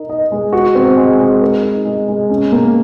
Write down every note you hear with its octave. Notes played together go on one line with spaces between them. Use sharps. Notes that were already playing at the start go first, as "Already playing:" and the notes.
Already playing: D#4 A#4
D#5
G#3
F#4
C4
G#3
G#3
A#4
D#4
G#3
G#3
C#4
A#3